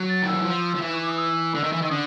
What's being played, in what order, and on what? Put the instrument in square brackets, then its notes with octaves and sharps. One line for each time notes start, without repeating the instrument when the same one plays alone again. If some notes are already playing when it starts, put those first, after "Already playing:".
Already playing: [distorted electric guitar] F#3
[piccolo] A6
[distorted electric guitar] D#3
[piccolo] E6
[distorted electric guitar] E3
F3
F3
E3
[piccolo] C#6
D6
D#6
E6
[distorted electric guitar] D3
D#3
E3
[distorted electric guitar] D#3 [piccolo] E6
[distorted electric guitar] D3 [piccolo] D#6